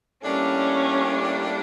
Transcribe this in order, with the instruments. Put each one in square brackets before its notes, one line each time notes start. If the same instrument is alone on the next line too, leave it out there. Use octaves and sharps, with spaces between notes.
[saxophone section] A2 G3 A#3 D4 [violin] C#4